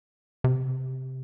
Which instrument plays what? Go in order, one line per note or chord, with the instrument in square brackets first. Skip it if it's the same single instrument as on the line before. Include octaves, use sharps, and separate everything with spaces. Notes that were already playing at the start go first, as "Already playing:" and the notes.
[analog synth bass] C3